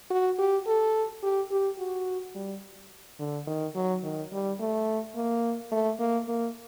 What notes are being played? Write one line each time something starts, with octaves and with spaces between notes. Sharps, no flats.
F#4
G4
A4
G4
G4
F#4
G3
D3
D#3
F#3
D#3
G3
A3
A#3
A3
A#3
A#3